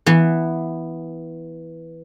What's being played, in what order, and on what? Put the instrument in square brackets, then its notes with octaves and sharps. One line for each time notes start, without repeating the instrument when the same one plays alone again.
[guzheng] E3 B3